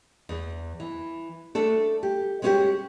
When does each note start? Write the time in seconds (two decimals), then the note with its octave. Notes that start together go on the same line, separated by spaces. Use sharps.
0.29 E2
0.80 E3
1.55 A3 D4 A4
2.03 G4
2.42 G#3 B3 C#4 E4 F#4 G4